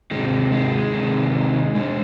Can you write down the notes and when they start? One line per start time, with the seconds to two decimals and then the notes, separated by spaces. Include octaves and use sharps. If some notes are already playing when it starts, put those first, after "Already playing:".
0.11 C3 D#3 G#3
0.52 G#3
0.93 C3 D#3
1.75 B2 G#3